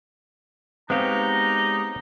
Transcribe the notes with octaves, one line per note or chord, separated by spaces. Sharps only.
G#3 B3 C4 D#4 G4 C#5 F5 A#5